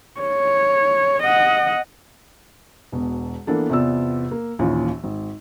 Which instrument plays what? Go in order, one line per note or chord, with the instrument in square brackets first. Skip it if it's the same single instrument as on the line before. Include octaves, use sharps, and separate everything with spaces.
[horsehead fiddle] C#5
D#5 F#5
[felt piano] E1 B2
E3 A#3 B3 D4 A4
E2 C3 B3 F4 D5 E6
A#3
A#1 D#2 E3 C#4 F4
G#1